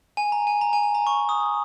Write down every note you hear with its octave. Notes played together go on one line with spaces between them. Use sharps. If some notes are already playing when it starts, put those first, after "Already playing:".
G#5
A#5
G#5
A#5
G#5
G#5
A#5
C#6
D#6